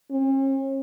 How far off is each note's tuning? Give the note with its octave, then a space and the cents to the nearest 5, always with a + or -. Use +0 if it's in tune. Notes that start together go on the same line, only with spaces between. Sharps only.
C#4 -45